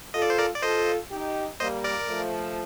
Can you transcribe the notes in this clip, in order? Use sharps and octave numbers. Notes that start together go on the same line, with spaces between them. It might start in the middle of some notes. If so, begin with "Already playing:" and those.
F4 A4 D#5
D5
C5
A#4 D5
D5
F4 A4 C5 D#5
D#4 G4
G3 A#3 C5 D#5
A#4 D5
F3 A3